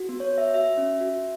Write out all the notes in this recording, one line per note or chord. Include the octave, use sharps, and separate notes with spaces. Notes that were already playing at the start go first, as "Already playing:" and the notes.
Already playing: F#4
B3
C#5
F#4
E5
F#4 E5
C#4
F#4